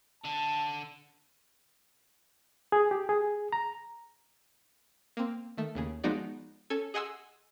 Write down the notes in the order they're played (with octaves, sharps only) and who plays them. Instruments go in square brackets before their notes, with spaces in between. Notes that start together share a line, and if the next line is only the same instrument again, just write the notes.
[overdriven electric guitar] D3 [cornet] A5
[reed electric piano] G#4
G4
G#4
A#5
[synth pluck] A#3 C4
D#3 A3
D#2 C#3 G#4
F3 G#3 B3 D#4 F#4 D5
C#4 A4 G#5 G#6
G#4 D#5 F#5 G#5 C6 E6